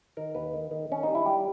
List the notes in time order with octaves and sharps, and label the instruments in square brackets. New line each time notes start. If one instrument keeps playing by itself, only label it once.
[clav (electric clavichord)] D#3 A#4
D#2 B4
D#3
D#3
D#3 C#4
G3 D#4
E4
G3 G4